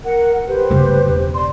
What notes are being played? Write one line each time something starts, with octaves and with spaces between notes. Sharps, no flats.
A#4 F#5
G4 B4 C5
G2 C#3
E1
D5 C6